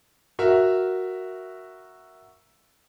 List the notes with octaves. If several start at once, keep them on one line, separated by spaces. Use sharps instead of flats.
F#4 A#4 E5